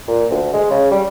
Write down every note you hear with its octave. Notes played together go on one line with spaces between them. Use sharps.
A#2
D2
G#3
C#3
G3